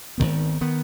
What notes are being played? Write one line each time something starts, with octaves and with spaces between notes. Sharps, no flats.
G#1 F#2 D#3 B3
D#3 B3